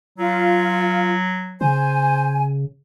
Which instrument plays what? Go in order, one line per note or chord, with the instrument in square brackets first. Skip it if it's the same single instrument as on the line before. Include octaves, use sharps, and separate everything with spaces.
[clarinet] F#3 [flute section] F4
[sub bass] C#3 [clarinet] C5 [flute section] G#5